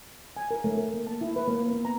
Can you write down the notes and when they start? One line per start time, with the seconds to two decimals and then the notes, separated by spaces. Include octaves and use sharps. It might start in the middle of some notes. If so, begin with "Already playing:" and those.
0.37 G#5
0.51 A#4
0.64 A3
0.77 A#4
0.94 A#3
1.07 A5
1.21 E4
1.36 B4
1.48 A#3
1.71 B3
1.85 A#5